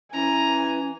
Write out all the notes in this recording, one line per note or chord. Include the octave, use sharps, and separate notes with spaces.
E3 C#4 G#5 A#5